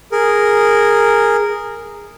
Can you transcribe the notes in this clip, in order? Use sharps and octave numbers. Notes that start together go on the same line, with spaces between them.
G#4 A#4